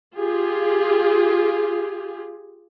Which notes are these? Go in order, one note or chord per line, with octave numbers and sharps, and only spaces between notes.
F4 G4 G#4